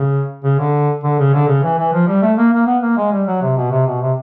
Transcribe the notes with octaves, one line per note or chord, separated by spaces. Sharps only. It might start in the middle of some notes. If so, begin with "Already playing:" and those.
Already playing: C#3
C#3
D3
D3
C#3
D3
C#3
E3
E3
F3
G3
A3
A#3
A#3
B3
A#3
G#3
G3
F#3
C3
B2
C3
B2
C3